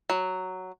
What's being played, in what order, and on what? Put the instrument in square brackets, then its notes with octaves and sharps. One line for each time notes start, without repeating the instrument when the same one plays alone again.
[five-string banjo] F#3